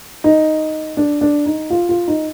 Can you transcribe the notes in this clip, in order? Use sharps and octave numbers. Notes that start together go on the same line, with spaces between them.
D#4
D4
D4
D#4
F4
F4
D#4